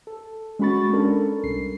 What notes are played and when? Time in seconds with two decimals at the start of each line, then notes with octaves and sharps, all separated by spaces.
0.07 A4
0.59 G#3 C#4 F#4 B5 C#6 A6
0.93 C#4 D4 A4 A#4
1.43 C2 C7